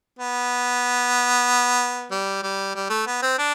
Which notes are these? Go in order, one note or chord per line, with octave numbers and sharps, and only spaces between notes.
B3
G3
G3
G3
A3
B3
C4
D4